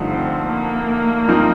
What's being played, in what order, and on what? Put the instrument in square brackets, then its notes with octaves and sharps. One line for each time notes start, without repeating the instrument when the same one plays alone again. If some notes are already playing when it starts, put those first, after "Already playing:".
Already playing: [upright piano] G2 D3 F3 A3 D#4
[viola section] C4
A#3
[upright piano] G2 F3 C4 D#4